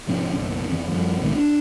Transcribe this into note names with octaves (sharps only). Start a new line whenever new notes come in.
G#2 C3 F3 C#4
F#1 B1
F2 E3
F#2 F3 G3
B1 A2 D#3 G#3
D4